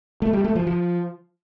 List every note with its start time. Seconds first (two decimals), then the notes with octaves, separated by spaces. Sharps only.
0.22 A3
0.33 G3
0.44 A3
0.56 F3
0.67 F3